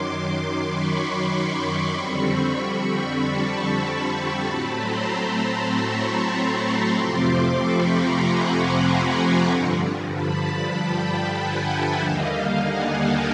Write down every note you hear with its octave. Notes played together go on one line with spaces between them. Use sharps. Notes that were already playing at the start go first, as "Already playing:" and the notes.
Already playing: F#2 D#3 F#3 C6 D6
B5 C#6
C6 D6
B5 C#6
F2 D3 G3 C4
A5 B5
A2 F#3 A3 C4 A5 B5
A#5 C6
B5 C#6
F2 C3 F3 A3 C4 C6 D6
B5 C#6
A#5 C6
F#5 G#5
F#5 G#5
G2 D3 F3
A5 B5
G5 A5
F#5 G#5
E5 F#5
D#2 D3 G3 A#3 D#5 F5
F#5 G#5
G5 A5